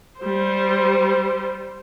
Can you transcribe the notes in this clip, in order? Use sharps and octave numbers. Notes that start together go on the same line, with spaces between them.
G3 C5